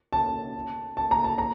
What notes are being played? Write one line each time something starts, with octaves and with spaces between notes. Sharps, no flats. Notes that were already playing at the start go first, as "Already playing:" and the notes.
A5
A5
A#5
A5
A#5